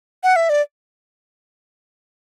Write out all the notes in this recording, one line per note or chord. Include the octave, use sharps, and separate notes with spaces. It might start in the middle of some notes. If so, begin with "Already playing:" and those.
F#5
E5
D5